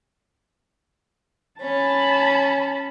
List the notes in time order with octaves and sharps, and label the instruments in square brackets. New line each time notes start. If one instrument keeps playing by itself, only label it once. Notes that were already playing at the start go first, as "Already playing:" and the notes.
[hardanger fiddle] C#4 [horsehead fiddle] A5 B5